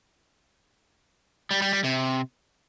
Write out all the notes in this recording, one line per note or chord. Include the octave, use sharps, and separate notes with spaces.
G3
G3
G3
C3